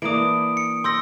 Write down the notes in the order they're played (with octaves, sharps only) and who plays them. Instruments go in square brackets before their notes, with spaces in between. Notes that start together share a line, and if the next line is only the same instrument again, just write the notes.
[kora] E3 A#3 D4 [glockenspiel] D#6 D7
[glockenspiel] C#7
[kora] G5 [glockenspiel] C6 E6 A#6